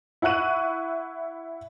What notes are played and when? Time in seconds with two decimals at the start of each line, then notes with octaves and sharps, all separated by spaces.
0.22 E4 F#5 C#6 F#6 D#7